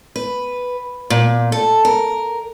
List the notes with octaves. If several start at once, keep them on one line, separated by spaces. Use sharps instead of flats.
B4
A#2
A4
A#4